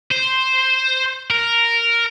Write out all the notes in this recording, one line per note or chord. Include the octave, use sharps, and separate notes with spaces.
C5
A#4